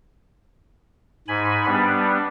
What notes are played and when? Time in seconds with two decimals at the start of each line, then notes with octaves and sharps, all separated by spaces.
1.28 G#2 G#5 B5
1.66 G3 B3 D4